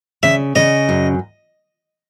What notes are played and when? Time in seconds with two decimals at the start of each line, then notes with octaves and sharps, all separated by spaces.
0.23 C#3 E5
0.56 C#3 D#5
0.89 F#2